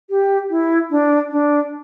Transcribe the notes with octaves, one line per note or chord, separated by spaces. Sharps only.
G4
E4
D4
D4